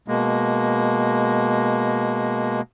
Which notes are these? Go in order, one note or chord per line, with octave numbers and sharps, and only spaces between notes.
B2 G#3 A#3